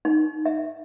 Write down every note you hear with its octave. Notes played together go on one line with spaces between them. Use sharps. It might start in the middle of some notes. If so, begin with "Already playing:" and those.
D#4
E5